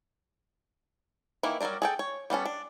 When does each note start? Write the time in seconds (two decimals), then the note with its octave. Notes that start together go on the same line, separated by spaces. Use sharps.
1.43 D#3 E3 A#3 E4
1.61 F#3 G3 F#4 A#4 D5
1.82 G#4 A4 G5
1.99 C#5
2.30 G3 B3 C#4 A4
2.46 D4